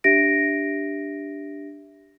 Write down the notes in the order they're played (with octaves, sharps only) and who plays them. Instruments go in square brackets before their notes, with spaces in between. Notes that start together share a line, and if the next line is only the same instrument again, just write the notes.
[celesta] D4 G4 E5 A#6 D7